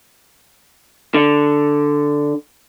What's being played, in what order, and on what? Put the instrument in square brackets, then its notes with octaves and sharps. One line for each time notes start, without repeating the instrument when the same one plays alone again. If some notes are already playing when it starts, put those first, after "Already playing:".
[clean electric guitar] D3